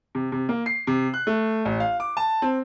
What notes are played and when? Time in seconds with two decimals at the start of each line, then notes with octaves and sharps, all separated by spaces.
0.15 C3
0.32 C3
0.49 A#3
0.66 C7
0.87 C3
1.14 F#6
1.27 A3
1.65 A1
1.80 F5
2.00 D6
2.17 A5
2.42 C4